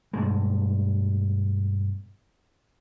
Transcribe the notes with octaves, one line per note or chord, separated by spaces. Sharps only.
G2 B2 G#3